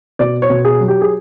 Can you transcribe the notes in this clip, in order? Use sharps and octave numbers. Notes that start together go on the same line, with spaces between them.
B2 D5
C#5
B2
G#4
F#3
G4
G#4